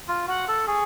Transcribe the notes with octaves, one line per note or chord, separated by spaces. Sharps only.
F4
F#4 F#5
A4
G#4 C#6